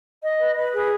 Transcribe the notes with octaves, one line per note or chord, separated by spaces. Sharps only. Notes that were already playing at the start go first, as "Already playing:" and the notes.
D#5
B4
B4
G#4